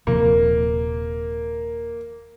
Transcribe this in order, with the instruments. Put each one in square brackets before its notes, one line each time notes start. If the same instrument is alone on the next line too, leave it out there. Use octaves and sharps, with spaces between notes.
[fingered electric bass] D#1 C3 F3 [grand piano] A#3